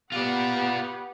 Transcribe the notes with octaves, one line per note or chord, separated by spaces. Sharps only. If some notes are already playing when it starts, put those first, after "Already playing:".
B3 F4 G4 D5 F#5